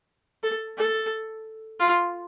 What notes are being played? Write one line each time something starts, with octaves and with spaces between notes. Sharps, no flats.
A4
A4
F4